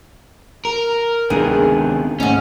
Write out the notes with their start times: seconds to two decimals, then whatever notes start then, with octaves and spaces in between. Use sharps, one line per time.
0.65 A#4
1.30 D2 C3 D#3 G#3 B3 D4 G#4
2.20 D#2 G#2 A3 C#4